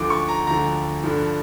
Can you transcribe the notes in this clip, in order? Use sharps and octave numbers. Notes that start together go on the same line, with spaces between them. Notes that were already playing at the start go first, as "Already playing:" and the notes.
Already playing: D2 D3 F3 D6
C#6
A#5
D2 D3 F3 A#5
G2 D3 F3